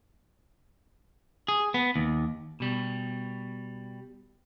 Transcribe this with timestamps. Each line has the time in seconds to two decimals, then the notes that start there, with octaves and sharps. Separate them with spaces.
1.48 G#4
1.74 B3
1.96 D#2
2.60 B2 G3